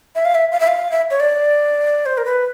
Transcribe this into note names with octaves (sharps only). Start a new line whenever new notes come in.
E5
F5
E5
F5
E5
F5
E5
C#5
D5
C5
A#4
B4